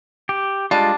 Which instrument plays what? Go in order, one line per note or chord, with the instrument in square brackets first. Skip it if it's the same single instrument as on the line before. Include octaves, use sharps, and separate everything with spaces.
[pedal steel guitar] G4
[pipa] G3 D4 [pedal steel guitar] G#3 F4